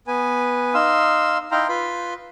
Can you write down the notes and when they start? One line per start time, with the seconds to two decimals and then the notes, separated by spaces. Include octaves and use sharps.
0.07 B3 B4 G#5
0.74 D#4 F5 C6 E6
1.51 D#4 E4 F5 G5 A#5 C6
1.69 F4 B4 B5 C6